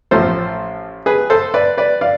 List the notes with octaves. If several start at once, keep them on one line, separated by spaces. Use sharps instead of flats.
A1 A2 F3 A4 C5
G#4 B4
A4 C5
B4 D5
B4 D5
D5 F5